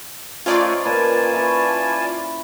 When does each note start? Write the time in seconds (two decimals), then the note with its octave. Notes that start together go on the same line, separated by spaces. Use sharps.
0.46 A3 C#4 D#4 F4 C5 D5 G#5
0.85 A#2 B4 G#5 A5
1.33 E4 B4 C#5